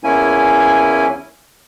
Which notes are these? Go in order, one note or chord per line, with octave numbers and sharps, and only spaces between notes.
E2 A#3 C#4 E4 G#5